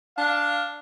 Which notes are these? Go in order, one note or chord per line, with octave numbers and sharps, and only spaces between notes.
D4 F5